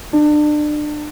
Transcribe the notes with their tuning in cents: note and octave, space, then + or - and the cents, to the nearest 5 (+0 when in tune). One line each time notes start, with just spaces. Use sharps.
D4 +30